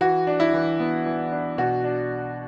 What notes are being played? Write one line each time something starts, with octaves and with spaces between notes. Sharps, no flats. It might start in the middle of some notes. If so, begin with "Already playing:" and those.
E3 F#4
D4
E4
E3
B3
E3
D4
B2 F#4
D4